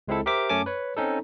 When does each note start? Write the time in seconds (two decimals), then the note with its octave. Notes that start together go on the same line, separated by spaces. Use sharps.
0.08 C#2 G#3 C4 E4 A4
0.26 G4 A#4 C5 E5 D6
0.49 F#2 A3 C#4 G#5 A5 D6
0.66 B4 C#5
0.96 C4 C#4 D#4 A4